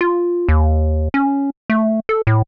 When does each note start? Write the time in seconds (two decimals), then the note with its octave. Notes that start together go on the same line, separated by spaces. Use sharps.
0.01 F4
0.49 D#2
1.14 C#4
1.70 A3
2.09 A4
2.27 A2